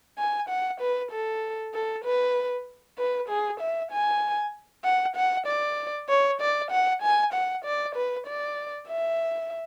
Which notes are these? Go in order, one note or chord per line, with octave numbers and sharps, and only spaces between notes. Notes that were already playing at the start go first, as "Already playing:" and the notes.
G#5
F#5
B4
A4
A4
B4
B4
G#4
E5
G#5
F#5
F#5
D5
C#5
D5
F#5
G#5
F#5
D5
B4
D5
E5